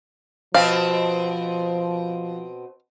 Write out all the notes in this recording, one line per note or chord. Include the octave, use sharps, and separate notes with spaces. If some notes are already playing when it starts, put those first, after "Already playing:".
B2 F3 C4 F5